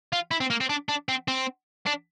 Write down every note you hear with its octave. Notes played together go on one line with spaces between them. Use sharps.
F4
E4
C4
A#3
C4
D4
D4
C4
C4
D4